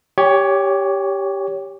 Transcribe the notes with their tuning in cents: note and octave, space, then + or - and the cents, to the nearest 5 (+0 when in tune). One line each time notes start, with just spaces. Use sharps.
G4 +0 C#5 +15 G#5 -40